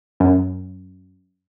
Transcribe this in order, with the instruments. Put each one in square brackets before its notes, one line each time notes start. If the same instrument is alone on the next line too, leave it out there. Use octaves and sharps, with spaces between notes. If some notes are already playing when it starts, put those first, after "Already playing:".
[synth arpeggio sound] F#2